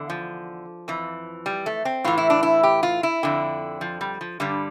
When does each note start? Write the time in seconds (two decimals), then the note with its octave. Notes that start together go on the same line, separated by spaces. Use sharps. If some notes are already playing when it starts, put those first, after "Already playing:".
Already playing: E2 D3
0.10 F3
0.88 F2 E3
1.46 G3
1.66 A3
1.85 C4
2.04 A2 E3 F4
2.18 E4
2.30 D4
2.43 E4
2.63 G4
2.83 F4
3.03 E4
3.23 F2 D3
3.81 F3
4.01 G3
4.21 F3
4.40 G2 D3 G3